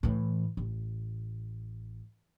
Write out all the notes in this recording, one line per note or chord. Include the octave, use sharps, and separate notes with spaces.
A2 E3
A1